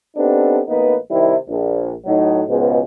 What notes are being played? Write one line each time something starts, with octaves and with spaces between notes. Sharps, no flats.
B3 C4 D4 D#4 G4 A4
A1 A#3 B3 D#4 B4
C3 D#3 G3 E4
A#1
A2 F#3 D#4
C#2 G#2 B2